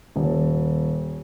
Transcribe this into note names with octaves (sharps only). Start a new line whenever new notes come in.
D#1